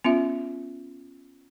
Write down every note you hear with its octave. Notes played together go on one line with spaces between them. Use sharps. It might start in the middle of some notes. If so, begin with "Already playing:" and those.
B3 C#4 F4 E5